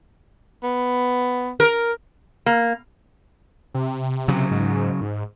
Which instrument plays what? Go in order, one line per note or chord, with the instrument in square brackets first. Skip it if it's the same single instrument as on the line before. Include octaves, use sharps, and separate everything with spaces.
[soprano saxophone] B3
[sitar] A#4
[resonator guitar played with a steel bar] A#3
[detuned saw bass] C3
[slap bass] C#3 F#3
[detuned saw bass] G#2
G#2